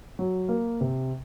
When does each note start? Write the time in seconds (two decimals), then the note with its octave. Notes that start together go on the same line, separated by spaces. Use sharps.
0.19 F#3
0.49 A#3
0.81 C3